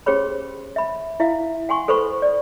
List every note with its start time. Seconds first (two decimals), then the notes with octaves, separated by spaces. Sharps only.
0.06 C#4 G4 G#4 C5 C#5 B5
0.76 E5 B5
1.20 E4 E5 F5
1.69 F#5 G#5 C6 C#6
1.88 A4 B4 C5 B5 C#6
2.22 D5